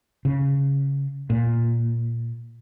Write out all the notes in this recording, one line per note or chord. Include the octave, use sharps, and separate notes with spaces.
C#3
A#2